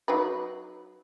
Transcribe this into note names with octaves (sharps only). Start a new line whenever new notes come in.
F#3 D#4 B4